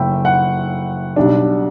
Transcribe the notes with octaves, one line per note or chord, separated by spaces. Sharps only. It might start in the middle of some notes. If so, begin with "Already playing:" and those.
Already playing: F#1 A3 G5 B5 E6
F#5
B1 B2 G3 D4